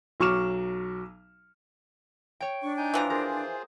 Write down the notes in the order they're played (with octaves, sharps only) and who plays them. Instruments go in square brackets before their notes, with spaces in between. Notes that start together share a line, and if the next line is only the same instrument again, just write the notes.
[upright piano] B1 F#3 C#6 D6 F6 E7
[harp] C#5 G5
[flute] D4 [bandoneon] C#6
[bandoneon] D#4 G#5 G6
[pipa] E3 F3 A#5
[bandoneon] F4 G#4 C5 [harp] A#4